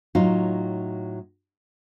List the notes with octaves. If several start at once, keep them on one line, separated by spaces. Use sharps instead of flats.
A2 F#3 D#4 F4